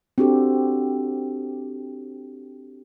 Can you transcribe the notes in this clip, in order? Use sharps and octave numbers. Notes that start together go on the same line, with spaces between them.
C4 D4 F#4 G4 A4